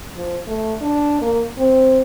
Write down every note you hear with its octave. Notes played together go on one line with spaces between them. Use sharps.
F3
A3
D4
A#3
C4